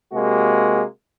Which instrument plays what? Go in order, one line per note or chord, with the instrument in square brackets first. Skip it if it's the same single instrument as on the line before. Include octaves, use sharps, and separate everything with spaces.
[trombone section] C3 G#3 A#3 F#4